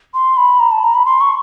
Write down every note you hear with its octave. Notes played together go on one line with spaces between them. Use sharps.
C6
B5
A#5
A5
A#5
B5
C6
C#6